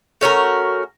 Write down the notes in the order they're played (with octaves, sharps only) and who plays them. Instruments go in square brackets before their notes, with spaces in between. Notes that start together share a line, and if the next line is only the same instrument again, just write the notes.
[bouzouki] A3 C#4 F#4 A#4